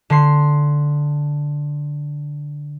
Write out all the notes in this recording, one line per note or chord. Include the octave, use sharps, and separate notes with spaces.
D3 C6 C7